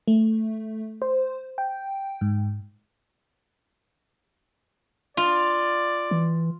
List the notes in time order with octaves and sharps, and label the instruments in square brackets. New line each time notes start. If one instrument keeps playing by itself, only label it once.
[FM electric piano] A3
C5
G5
G#2
[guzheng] F4 [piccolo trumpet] D5
[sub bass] E3